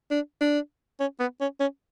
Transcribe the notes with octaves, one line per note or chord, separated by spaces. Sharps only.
D4
D4
C#4
B3
C#4
C#4